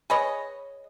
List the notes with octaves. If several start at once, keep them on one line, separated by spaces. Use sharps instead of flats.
G#4 B4 C#5 D#5